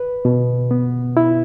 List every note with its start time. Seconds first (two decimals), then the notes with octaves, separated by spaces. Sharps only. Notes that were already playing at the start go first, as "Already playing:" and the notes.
Already playing: B4
0.25 B2
0.71 B3
1.17 E4